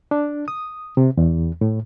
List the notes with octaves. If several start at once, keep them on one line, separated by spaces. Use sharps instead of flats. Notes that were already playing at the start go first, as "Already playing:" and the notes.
D4
D#6
C3
E2
A2